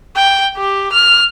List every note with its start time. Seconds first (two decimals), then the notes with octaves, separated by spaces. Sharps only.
0.16 G5
0.57 G4
0.92 F6